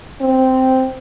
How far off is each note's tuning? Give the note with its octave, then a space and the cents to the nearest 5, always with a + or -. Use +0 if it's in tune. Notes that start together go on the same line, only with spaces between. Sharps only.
C4 -5